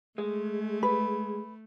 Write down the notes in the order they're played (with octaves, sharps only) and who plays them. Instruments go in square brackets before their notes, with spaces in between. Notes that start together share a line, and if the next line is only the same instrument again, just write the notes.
[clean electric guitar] G#3 [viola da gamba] A3
[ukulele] B4